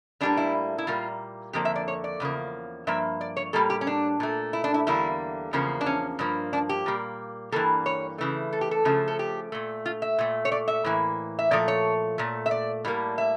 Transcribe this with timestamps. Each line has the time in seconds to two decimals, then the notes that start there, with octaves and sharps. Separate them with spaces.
0.21 A2 G3 A#3 D4
0.37 E4
0.78 E4
0.87 A#2 G3 A#3 F4
1.53 F2 D3 F3 A#3 G4
1.65 E5
1.76 D5
1.88 C#5
2.04 D5
2.20 E2 C#3 F3 A#3
2.87 G2 F3 A#3 E5
3.21 D5
3.37 C#5
3.53 A2 G3 A#3 A4
3.70 G4
3.81 C#4
3.87 D4
4.20 A#2 A3
4.53 E4
4.64 D4
4.74 E4
4.87 E2 D3 G3 A#3 E4
5.53 E2 C#3 F3 A#3
5.81 D4
5.86 C#4
6.19 G2 F3 A#3
6.53 D4
6.69 G4
6.86 A#2 G3 A#3
7.52 G2 E3 G3 A#3 A4
7.86 C#5
8.18 C#3 E3 A3
8.53 A4
8.61 G4
8.71 A4
8.85 C#3 F3 A3
9.08 A4
9.19 G4
9.52 A#2 A3
9.86 F4
10.02 E5
10.19 A#2 A3
10.45 C#5
10.52 D5
10.68 E5
10.85 A2 E3 A#3
11.39 E5
11.51 A#2 F3 A3 D5
11.68 C#5
12.18 A#2 A3
12.46 E5
12.51 D5
12.85 A2 G3 A#3
13.18 E5